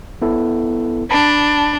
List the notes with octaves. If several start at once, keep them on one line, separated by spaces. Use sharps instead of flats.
B3 E4 A4
D4 A5 B5